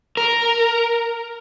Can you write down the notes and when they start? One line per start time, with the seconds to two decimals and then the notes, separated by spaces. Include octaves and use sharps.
0.17 A#4